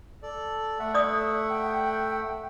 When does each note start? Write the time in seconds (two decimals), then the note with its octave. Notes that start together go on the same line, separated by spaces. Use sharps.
0.23 A4 D5
0.79 A3 E5 F#5
0.94 D5 D#6
1.50 G5